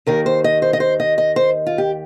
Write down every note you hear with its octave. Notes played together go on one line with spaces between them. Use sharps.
D#2 D#3 A#4
C5
D#5
C5
D#5
C5
D#5
D#5
C5
F4
G4